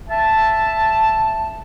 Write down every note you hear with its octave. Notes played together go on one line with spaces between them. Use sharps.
E5 A5